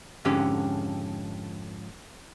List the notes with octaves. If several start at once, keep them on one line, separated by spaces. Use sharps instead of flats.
F2 G#2 D3 C#4 G4